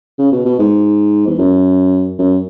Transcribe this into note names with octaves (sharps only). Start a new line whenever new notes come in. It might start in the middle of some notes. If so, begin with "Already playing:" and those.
C#3
B2
B2
G#2
E2
F#2
F#2